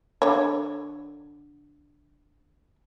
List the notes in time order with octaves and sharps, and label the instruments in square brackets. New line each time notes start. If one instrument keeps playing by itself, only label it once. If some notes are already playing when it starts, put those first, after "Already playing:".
[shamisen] D3 C#5